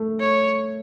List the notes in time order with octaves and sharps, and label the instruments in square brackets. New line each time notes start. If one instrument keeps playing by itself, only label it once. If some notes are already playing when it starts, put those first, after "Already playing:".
Already playing: [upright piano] A3
[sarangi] C#5